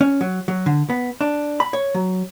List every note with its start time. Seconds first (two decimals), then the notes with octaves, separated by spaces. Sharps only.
0.01 C#4
0.21 F#3
0.48 F#3
0.66 D3
0.90 B3
1.21 D4
1.60 B5
1.73 C#5
1.95 F#3